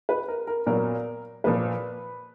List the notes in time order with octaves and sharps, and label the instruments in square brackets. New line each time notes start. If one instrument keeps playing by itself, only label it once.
[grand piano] B4
A#4
A#4
[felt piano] A#2 F#3 B3 [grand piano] A#4
[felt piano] A#2 F3 A#3 [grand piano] B4